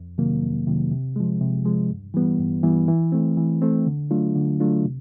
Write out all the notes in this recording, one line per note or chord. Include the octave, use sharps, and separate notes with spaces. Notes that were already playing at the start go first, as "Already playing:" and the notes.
Already playing: F2
C3 D#3 F#3 A#3
F2
C3 D#3 F#3 A#3
C3
F3 G#3
C3
F3 G#3
G2
E3 G3 B3
G2
E3 G3 B3
E3
A3 C4
E3
A3 C4
D3
F#3 A3 D4 F4
D3
F#3 A3 D4 F4
C3